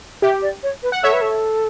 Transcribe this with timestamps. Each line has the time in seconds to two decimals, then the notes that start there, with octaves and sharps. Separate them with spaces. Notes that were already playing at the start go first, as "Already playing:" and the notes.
0.22 G4 E5
0.42 D5
0.63 C#5
0.83 B4
0.92 F#5
1.03 A4 C#5 E5
1.13 B4
1.22 A4